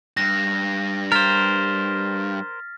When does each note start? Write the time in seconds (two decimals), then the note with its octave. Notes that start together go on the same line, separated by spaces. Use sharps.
0.17 G2 A#6
1.12 A#4 C5 F6 A6 B6